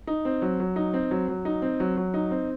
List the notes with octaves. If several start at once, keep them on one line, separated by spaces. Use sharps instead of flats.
D#4
C4
F#3
F#3
D#4
C4
F#3
F#3
D#4
C4
F#3
F#3
D#4
C4